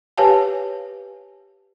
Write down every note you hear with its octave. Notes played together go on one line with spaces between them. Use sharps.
G4 B4 C#5 F5 G#5 A5